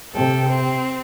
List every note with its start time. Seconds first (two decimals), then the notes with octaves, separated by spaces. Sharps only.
0.13 C3 A4 G5
0.48 C4